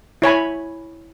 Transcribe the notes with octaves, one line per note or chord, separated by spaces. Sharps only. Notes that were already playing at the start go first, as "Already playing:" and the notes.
E4 C#5 G#5 B5